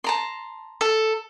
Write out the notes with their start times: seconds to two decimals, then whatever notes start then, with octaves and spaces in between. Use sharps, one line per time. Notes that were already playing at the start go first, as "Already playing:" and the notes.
0.04 A5 A#5 C6
0.81 A4